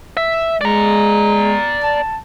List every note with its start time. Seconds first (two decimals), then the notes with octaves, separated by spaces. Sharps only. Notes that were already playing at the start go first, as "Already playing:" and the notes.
0.17 E5
0.61 G#3 D5 A#5
1.83 A5